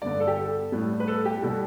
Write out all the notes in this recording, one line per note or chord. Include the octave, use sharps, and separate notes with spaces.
G2 D3 B3 D5
A4
G4
A4
A2 G3 B3
B4
A4
G4
B2 G3 B3 A4